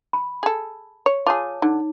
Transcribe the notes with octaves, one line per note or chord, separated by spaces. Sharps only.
B5
G#4 A4
C#5
F4 G#4 C#5 A5 D6
D3 D#4